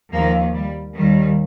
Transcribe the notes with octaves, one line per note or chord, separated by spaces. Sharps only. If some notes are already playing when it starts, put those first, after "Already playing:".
D#2 D#3 F3 A#3
G3
D#2 D#3 G3